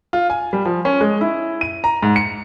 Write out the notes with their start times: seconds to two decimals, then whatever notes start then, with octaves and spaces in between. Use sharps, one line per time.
0.13 F4
0.30 G#5
0.53 G3
0.65 F3
0.85 C#4
1.01 G#3
1.21 E4
1.61 D#7
1.84 A#5
2.03 G#2
2.16 C#7